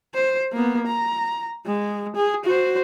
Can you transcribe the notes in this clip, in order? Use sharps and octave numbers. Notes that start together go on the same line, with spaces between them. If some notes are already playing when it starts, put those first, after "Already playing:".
C5
A#3 B3
A#5
G#3
G#4
F#4 C5